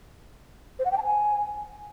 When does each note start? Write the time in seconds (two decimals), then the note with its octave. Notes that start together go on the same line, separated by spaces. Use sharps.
0.79 C5
0.85 F#5
0.91 G5
0.98 A5
1.04 G#5